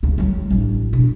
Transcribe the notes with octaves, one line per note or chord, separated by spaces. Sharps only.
D2 C#3
F#3 G3
A1 D4
B2 D4